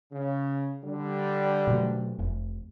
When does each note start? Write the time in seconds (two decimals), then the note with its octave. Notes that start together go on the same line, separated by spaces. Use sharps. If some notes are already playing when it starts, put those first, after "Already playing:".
0.12 C#3
0.85 D3 G3
1.67 B2 F#3 A3
2.19 F1